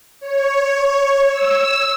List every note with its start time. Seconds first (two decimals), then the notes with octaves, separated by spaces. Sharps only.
0.20 C#5
1.27 E6